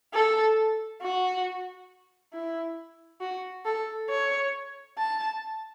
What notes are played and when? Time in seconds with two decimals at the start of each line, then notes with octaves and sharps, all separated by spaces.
0.14 A4
1.02 F#4
2.33 E4
3.21 F#4
3.66 A4
4.09 C#5
4.98 A5